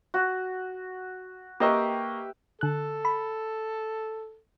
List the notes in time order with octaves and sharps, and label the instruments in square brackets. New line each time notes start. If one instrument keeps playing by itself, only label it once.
[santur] F#4
[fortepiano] A#3 D#5 C#6 [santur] G4 B4 E5
[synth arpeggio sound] D3 F#6 [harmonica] A4
[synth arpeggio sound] B5